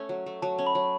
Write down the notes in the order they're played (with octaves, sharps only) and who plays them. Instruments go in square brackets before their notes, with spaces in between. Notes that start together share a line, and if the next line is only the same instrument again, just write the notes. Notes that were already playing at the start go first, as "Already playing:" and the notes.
Already playing: [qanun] A3 C#4
F#3
A3
[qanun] F#3 [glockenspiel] A5
[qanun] C#4
[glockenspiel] B5
[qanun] F#3